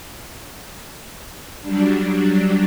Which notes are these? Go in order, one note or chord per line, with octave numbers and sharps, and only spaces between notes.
F#3 G3 D4